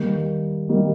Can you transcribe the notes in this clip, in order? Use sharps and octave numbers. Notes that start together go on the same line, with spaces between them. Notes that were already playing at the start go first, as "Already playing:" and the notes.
Already playing: D#3 G3 A#3
D#3 G3 A#3